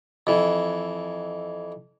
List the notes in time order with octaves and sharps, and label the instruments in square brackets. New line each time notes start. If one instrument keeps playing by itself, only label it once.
[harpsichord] F2 E3